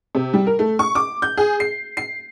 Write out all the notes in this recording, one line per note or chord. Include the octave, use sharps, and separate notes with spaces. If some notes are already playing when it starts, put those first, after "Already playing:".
C3
G3
A#4
A3
C#6
D6
G6
G#4
C7
C7